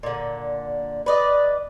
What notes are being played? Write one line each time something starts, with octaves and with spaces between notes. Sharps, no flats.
A#2 D3
B4 D5 D#5